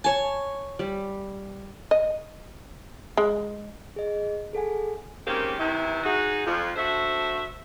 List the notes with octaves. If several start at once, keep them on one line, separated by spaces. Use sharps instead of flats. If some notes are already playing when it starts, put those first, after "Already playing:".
C#5 G#5 A5
G3
D#5
G#3
G#4 D#5
G#4 A4 F#5 G#5
D#3 G#3 A#3 C4 C#4 G4
C3 D#3 E3 E4
D#4 F#4 G#4
F2 F3
D4 F#4 A4 C5 E5